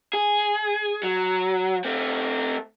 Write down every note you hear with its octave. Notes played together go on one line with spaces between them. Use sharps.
G#4
F#3
A3 C4